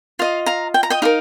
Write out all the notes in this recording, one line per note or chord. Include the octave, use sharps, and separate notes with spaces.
F4 D#5 F5
F5 A#5
G5
A#5
D#5 G5
D#4 G4 A#4 F5